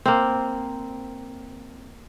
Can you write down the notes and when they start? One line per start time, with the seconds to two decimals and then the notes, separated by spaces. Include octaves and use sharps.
0.06 A#3 C4